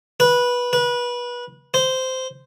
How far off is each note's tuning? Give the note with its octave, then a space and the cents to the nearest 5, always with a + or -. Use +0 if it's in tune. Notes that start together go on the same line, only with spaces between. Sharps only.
B4 -15
B4 -25
C5 -10